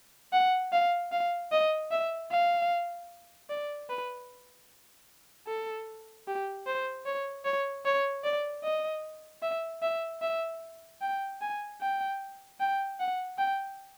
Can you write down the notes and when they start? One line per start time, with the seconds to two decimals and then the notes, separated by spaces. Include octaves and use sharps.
0.33 F#5
0.73 F5
1.12 F5
1.52 D#5
1.91 E5
2.31 F5
3.50 D5
3.89 B4
5.47 A4
6.27 G4
6.67 C5
7.06 C#5
7.45 C#5
7.85 C#5
8.24 D5
8.64 D#5
9.42 E5
9.82 E5
10.22 E5
11.01 G5
11.41 G#5
11.81 G5
12.60 G5
13.00 F#5
13.38 G5